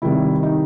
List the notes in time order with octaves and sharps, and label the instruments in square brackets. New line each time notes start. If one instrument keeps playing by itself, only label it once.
[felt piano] C3 D#3 G3 E4
D#4